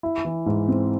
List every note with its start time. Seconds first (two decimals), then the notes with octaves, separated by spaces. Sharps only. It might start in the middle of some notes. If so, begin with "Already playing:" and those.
0.03 E4
0.25 E3
0.46 G#2
0.68 C4